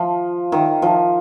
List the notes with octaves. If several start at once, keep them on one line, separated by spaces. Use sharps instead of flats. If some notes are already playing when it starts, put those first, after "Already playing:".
Already playing: F3
D#3
F3